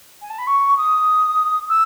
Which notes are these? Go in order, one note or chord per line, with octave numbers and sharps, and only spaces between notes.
G#5
A5
B5
C#6
D#6
E6